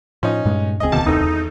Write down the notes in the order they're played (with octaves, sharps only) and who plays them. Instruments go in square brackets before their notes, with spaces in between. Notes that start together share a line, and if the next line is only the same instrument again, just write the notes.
[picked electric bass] A2 [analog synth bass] F3 [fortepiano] C#4 D#4
[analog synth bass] G2 [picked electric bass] A#2 G#3
[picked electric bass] D#1 C#2 C4 [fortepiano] G#4 D#5
[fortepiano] D#2 [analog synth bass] B2 [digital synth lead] A5
[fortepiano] G#1 A3 A4 [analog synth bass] E2 [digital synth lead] D#4